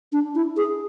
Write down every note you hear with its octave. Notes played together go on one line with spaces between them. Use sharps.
D4
E4
G#4